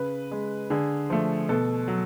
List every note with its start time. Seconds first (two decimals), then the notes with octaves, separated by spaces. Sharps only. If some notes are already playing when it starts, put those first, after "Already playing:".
Already playing: C#3 B4
0.31 G#3
0.70 D3 G#4
1.10 F3 A3
1.49 B2 A4
1.88 F#3